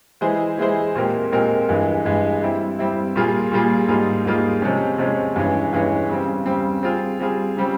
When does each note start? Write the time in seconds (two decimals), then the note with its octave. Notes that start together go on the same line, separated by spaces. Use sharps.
0.21 E3 G#3 E4 G#4 C5
0.58 E3 G#3 E4 G#4 C5
0.95 A#2 G#3 C4 G4 A#4
1.32 A#2 G#3 C4 G4 A#4
1.69 G2 E3 G#3
2.05 G2 E3 G#3
2.42 G3 C4 E4
2.79 G3 C4 E4
3.15 A#2 G3 A#3 F4 G#4
3.52 A#2 G3 A#3 F4 G#4
3.88 G#2 G3 A#3 F4 G#4
4.25 G#2 G3 A#3 F4 G#4
4.62 C3 F3 G#3 C#4
4.98 C3 F3 G#3 C#4
5.36 G2 E3 G#3 C#4
5.73 G2 E3 G#3 C#4
6.10 C#3 G3 C4
6.45 C#3 G3 C4
6.83 G3 C4 F4 G#4
7.20 G3 C4 F4 G#4
7.57 C#3 G3 C4